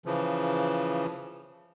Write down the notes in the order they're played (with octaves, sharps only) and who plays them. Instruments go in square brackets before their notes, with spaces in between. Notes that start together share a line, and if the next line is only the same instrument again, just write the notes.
[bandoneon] C#3 E3 F3